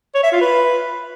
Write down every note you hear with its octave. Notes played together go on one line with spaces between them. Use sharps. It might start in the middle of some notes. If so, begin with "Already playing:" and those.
C#5
E5
F4
B4